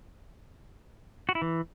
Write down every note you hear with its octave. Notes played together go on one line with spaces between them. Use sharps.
F#4
E4
E3